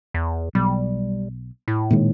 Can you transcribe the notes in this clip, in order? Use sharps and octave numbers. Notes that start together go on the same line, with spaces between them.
E2
B1 G3
A2
A#2 D#3 G#3